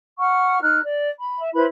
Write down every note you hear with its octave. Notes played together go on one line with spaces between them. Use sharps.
F#5 C#6 F6
D#4 F6 F#6
D5
B5
E5
E4 B4 C5 B5